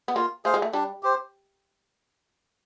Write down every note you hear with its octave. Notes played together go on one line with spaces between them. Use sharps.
B3
A#3 F4
A3 G#4 C5 F5
G#3
A3
G3 D4
G4 C5